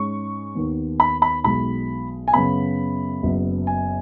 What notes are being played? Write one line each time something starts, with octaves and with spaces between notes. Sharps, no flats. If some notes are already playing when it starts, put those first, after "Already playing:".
Already playing: G#2 G#3 C#4 C#6
D#2 D#3 B3
B5
B5
B1 B2 G#3 B5
G#5
F#2 C#3 B3 B5
F#1 F#2 F#3 B3
G#5